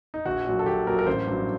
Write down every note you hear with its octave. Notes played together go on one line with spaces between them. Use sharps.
D#4
A#1 F#4
A#2 F#3
A4
A#1 G4
A#2 F#3 A#4
A#4
A1 C5
G2 F#3